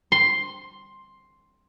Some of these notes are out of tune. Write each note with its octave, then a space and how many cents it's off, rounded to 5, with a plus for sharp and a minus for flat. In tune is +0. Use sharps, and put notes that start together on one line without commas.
C6 +5